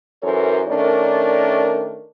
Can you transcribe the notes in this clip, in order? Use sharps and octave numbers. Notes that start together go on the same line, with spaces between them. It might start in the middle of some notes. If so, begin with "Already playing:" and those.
F#2 E3 A4 A#4 C5 C#5
D#3 A3 C#4 D4 A#4 D5